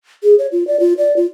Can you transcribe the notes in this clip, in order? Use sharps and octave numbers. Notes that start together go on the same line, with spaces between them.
G#4
C#5
F4
D5
F4
D5
F4